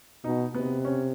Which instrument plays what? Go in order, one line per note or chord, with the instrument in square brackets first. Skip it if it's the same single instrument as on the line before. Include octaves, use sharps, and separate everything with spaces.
[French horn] B2 [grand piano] D#4
[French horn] C3 [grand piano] B3
[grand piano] C#4